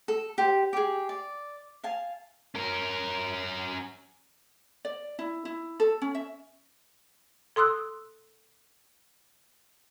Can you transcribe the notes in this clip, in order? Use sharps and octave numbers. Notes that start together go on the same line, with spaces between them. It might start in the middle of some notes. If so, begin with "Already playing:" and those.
A4
G4 C5
G4 G#4
D5
F5 G#5 A5
C#4 A#4
D5
E4
E4
A4
C#4
E5
A4 C6 D#6 E6 F#6